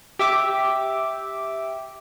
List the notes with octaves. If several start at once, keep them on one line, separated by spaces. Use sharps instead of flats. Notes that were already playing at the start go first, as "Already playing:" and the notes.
G4 E5 D6